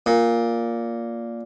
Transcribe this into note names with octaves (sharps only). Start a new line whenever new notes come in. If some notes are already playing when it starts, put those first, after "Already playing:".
A#2